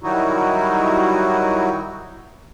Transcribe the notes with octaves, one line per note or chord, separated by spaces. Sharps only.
D#3 F#3 G3 D#4 E4 F#4